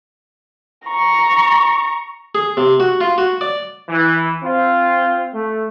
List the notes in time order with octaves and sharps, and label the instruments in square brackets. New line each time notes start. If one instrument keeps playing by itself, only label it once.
[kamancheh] A#5 C#6
[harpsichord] G#4
C3
F#4
F4
F#4
D5
[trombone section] E3
C4 F4
A3